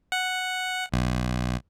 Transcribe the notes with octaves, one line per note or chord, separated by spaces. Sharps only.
F#5
B1